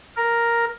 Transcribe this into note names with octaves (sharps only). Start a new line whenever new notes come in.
A#4